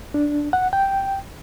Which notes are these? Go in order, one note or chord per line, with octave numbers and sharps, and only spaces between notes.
D4
F#5
G5